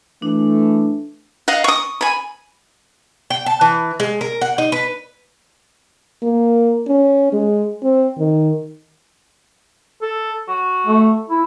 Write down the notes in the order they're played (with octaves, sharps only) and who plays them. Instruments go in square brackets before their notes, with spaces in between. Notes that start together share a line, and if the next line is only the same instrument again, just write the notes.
[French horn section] E3 A3 [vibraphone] D4
[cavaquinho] D#5 F5 F#5
C#6 D#6
G#5 B5
[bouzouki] G5
A5
E3
G#3
A#4
F#5
D#4
B4
[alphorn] A#3
C#4
G#3
C4
D#3
[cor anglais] A4
F#4
[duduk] A3
E4